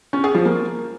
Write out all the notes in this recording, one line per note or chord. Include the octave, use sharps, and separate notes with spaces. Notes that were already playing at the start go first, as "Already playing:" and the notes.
C#4
G#4
F3
A#3